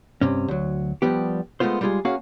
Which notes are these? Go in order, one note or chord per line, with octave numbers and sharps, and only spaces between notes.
G2 C3 C#4
D2 F#3
F3 G3 B3 G4
G#3 A3 B3 F4 C5
G3 G#3 B3 F4 G#4
A#3 C#4 F#4 G#4 F5